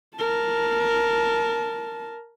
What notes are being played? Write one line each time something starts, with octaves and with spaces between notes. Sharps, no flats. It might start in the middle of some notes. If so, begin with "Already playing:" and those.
A#4 A5